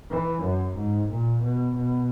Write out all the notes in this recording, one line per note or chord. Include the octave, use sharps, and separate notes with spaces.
E3
F#2
G#2
A#2
B2
B2